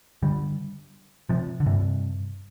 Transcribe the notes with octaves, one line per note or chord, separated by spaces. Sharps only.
D3 G3
C3 F3
D3
G2 C3